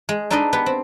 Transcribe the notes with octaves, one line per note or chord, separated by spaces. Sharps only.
G#3
D4 D#4 A4 B4 D5 D#5
B3 G4 B4
C4